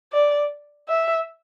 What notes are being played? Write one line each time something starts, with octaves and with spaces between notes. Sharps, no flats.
D5
E5